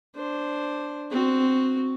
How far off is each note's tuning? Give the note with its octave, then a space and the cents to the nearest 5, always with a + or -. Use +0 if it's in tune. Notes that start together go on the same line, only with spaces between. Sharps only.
D4 +0 C5 +0
C4 -5 F#4 +0